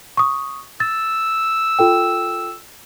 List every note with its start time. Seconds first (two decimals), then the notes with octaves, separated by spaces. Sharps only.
0.17 C#6 D#6
0.80 E6 A6
1.79 F4 A4 G5